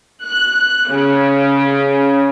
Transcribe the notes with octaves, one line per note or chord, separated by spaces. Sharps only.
F#6
C#3